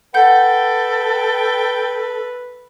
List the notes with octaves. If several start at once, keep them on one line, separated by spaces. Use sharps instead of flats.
A4 B4 F#5 G5 G6